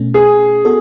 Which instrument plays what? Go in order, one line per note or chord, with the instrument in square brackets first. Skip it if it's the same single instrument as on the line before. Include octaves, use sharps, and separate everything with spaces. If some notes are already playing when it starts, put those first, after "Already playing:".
Already playing: [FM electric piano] B2 A3 C#4
[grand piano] G#4
[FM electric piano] B3 F#4 A4